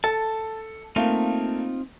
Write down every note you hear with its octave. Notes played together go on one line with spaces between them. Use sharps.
A4 A5
A3 A#3 C4 D#4 F4